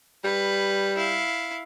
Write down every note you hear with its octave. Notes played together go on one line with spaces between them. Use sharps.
G3 B4
E4 F5